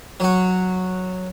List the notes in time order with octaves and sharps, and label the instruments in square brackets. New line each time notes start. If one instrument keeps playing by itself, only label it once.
[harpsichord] F#3 F#4